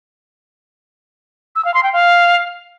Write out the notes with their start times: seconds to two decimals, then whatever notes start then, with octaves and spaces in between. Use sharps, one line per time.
1.55 E6
1.65 F5
1.74 C6
1.83 G5
1.93 F5